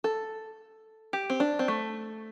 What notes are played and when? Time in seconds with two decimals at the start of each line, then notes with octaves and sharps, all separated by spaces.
0.04 A4
1.13 G4
1.30 C4
1.40 D4
1.59 C4
1.68 A3